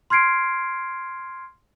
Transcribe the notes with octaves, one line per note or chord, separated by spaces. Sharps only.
C6 F6 G#6 C7 D7